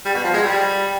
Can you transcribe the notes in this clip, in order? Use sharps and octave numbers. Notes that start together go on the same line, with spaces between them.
G3
B2
F3
G#3
G3